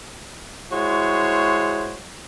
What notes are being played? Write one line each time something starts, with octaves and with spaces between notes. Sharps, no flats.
G#3 E4 F#4 C5 C#5